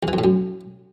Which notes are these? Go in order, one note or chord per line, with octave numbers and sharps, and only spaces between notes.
E2
E3
F2
A2
F#2